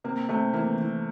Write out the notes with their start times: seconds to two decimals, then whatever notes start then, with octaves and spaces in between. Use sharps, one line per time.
0.04 C3 A#3
0.29 C3 A3
0.53 E3 A#3
0.78 E3